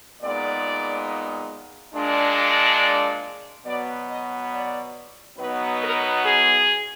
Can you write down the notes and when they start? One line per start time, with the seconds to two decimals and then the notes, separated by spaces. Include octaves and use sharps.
0.22 A#2 G#3 B3 D#4 D5
1.94 A#2 G#3 D4
2.81 D5
3.66 B2 F#3 B3 D5
4.09 D#5
4.53 D5
5.38 B2 F#3 B3 D#4 B4
5.81 A#4
6.24 G#4